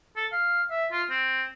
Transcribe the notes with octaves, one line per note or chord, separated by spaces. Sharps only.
A4
F5
E5
F4
C4